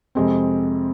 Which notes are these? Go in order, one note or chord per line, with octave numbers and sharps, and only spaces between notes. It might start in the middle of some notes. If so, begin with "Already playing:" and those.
F2 C3 G#3 C4